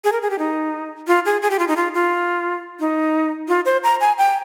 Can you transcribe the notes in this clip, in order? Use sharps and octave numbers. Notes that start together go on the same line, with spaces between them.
G#4
A#4
G#4
G4
D#4
F4
G#4
G#4
G4
F4
D#4
F4
F4
D#4
F4
C5
A#5
G#5
G5